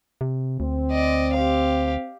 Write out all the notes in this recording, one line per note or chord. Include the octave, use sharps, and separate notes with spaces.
C3
D2 C4
D5 D#5
G4 F5